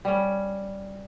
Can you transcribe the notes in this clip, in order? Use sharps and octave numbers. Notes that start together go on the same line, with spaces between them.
G3 C#4